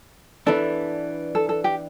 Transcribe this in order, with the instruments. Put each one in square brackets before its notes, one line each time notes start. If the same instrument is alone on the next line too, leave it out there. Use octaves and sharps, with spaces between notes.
[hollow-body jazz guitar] E3 B3 D4 [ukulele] A4
[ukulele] A4
A4
G4